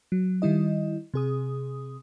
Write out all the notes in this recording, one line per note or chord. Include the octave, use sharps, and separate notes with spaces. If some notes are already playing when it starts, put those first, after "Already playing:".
F#3
D#3 G3 E4 D#5
C3 G#4 D#6